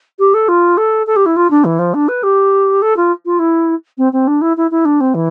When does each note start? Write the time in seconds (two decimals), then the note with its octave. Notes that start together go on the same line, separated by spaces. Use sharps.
0.19 G4
0.34 A4
0.48 F4
0.77 A4
1.07 A4
1.16 G4
1.26 E4
1.36 F4
1.51 D4
1.65 E3
1.79 F3
1.94 D4
2.08 B4
2.23 G4
2.82 A4
2.97 F4
3.26 F4
3.39 E4
3.98 C4
4.13 C4
4.27 D4
4.42 E4
4.57 E4
4.71 E4
4.85 D4
5.01 C4
5.15 E3